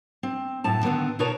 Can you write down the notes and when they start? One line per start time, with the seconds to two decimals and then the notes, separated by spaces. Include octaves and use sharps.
0.23 C4
0.64 F#2 A2 A5
0.83 D3 D#3 B3 C4
1.19 B2 D#4 A#4 B4 C#5 A5